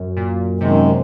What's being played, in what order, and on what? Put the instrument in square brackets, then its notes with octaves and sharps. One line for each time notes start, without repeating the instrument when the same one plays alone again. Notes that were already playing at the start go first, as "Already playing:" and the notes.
Already playing: [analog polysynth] F#2
A#2
[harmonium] F#2 D#3 G#3 [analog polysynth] C3